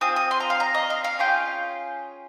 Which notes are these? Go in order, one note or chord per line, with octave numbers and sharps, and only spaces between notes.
C4 F4 G#4 D#6
D#6
C6
A#5
F5
A#5
D#5
F5
F5
C#4 F4 G#4 G5